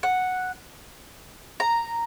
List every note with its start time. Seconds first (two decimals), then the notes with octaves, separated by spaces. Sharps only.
0.03 F#5
1.60 A#5